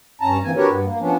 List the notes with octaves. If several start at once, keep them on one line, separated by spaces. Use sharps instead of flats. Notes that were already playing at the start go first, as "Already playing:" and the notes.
G2 C#4 A5 A#5
D3 E3 A#3 C4 G#5
D4 F#4 G4 A#4 B4 C#5
G2 B3
A#3
F3 B3 C#4 D4